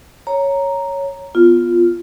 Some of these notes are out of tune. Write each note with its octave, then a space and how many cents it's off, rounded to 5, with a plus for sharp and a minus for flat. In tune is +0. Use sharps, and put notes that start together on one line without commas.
C#5 +0 A#5 +0
B3 +0 F4 +0